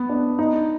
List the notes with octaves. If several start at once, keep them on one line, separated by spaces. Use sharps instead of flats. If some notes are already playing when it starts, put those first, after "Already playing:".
Already playing: B3
D4
D#4